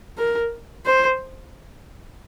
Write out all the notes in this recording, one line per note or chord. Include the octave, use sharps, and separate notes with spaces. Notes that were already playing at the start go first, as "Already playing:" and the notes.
A#4
C5